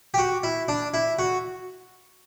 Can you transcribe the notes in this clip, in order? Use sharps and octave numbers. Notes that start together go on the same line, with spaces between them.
G4
F#4
E4
D4
E4
F#4